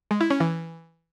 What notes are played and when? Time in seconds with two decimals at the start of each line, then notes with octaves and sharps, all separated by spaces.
0.11 G#3
0.21 E4
0.30 C#4
0.40 E3